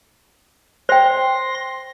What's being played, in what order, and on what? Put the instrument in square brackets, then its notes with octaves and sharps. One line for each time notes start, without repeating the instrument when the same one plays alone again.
[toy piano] C5 G5 [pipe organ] C6 A#6